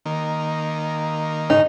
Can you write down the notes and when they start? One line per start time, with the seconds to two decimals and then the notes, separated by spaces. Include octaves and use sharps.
0.06 D#3 A#3
1.50 G#2 C#3 D#4